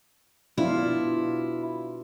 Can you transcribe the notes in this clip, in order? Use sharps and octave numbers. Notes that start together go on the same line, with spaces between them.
B2 D4 E4 F4